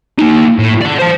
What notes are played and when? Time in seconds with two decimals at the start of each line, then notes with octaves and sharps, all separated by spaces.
0.19 A#3 D#4
0.59 A2
0.82 D5 F#5
0.99 C5 A5